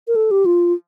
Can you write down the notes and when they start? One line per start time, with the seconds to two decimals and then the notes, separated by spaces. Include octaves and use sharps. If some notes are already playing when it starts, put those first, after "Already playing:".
0.08 A#4
0.16 A4
0.31 G4
0.46 F4